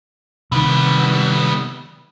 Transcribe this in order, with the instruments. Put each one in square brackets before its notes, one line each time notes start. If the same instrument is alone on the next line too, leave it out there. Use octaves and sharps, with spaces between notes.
[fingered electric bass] C3 D#3 [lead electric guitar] G3 B3